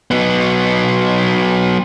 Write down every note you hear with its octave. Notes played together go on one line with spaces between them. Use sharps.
F#3 B3